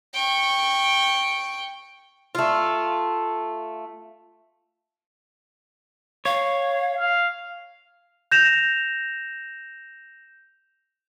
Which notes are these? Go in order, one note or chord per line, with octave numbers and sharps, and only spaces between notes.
G5 C#6
A3 F4
C#5 F5
F5
G6 A#6 E7 F7